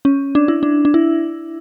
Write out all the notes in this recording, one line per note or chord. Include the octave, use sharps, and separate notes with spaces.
C#4
D4
E4
D4
D4
E4